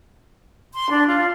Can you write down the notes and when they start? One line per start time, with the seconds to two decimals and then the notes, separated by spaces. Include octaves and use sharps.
0.73 C6
0.90 D4
1.06 F4